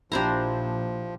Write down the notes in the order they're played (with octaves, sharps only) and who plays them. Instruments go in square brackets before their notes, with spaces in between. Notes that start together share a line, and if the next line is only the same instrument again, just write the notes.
[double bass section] A#1 [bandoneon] F3 [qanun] D4 C5 A#5 [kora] E4 G4